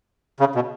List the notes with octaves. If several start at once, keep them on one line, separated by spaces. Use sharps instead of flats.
C#3
B2